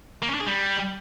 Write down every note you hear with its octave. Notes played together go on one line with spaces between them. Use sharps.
A#3
C#4
D4
G#4
G3